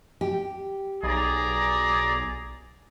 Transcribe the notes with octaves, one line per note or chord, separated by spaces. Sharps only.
G4
B1 G#4 D5 A#5